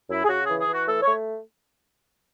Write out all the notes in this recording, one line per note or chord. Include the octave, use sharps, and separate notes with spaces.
F#2 E4
G#4
C#3 F#4
G#4
E3
G#4
E3 F#4
A3 A4
C#5
A3